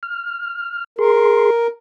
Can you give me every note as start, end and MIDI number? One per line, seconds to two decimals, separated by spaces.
0.03 0.84 89
0.99 1.50 68
0.99 1.67 70
0.99 1.50 84